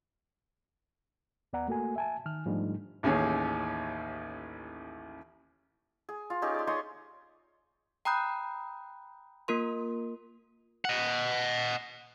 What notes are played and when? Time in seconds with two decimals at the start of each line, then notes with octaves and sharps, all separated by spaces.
1.53 D#2 B3 D5 F#5 A#5
1.68 A3 A#3 F#4 A4 G#5
1.96 E5 G#5 A5
2.26 D#3 F6
2.45 G#2 F3 G3 A3 D4 D#4
3.03 A1 D#2 C#4 G#4
6.09 G#4
6.30 F4
6.42 C#4 D#4 G4 G#4
6.54 D5 C6
6.67 D#4 C#5 C6 D#6
8.05 G5 A#5 B5 D#6 F#6 G6
9.48 A#3 F4 A#4 C6
10.85 D#5 F#5